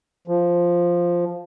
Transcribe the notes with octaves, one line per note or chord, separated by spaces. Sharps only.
F3